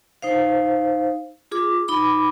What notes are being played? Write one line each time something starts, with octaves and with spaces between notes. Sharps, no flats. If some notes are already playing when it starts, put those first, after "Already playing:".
D#4 C5 F5
F4 G#4 D6
D#4 B5 D6